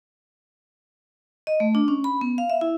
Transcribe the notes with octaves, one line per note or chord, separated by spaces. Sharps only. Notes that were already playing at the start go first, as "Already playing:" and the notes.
D#5
A3
D4
C#4
B5
B3
F5
E5
E4